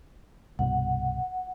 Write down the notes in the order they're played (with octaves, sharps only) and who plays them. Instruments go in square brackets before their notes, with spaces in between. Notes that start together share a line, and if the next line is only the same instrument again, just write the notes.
[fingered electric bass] C2 G2 B2 [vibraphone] F#5